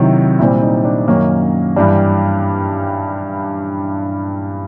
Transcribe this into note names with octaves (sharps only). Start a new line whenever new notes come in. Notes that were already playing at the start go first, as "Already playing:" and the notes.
Already playing: C3 D#3 F#3 E4
A#2 G3 C4 E4
D#4
D4
F#2 D#3 F#3 A#3 C#4 D#4
G2 E3 G3 D4